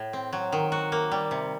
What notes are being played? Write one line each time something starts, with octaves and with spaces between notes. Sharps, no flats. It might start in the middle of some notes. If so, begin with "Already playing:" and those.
Already playing: A2
C4
F#3
D#3
F#4
A#3
G3
C3